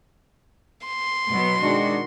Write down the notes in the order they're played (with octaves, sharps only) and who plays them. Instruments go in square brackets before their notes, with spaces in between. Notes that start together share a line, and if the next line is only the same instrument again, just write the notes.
[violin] C6
[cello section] B2 F#3 B3
[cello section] D#3 F#4 [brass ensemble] G#3 D4